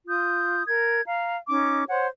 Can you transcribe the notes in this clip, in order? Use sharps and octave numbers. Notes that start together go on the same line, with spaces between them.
F4 D#6 G6
A#4 G#6
F5 A#5
C#4 D#4 D6
C5 C#5 F#5